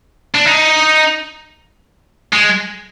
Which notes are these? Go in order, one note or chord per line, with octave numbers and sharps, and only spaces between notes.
D4
D#4
G#3